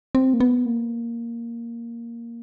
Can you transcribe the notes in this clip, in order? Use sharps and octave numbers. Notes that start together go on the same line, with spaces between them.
C4
A#3
B3
A#3